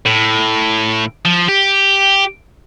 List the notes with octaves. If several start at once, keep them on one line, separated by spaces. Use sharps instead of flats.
A2
F3
G4